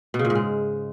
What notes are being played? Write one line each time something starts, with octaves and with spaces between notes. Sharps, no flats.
B2
C#3
A#2
G#2
G#3